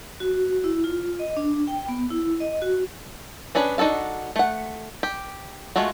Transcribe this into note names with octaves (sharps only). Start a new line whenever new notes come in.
F#4
E4
F4
D#5
D4
G5
B3
E4
D#5
F#4
C#4 D4 G#4 B4
D4 D#4 F#4 A4 F5
A3 F#5
G4
G#3 A3 F4 F#4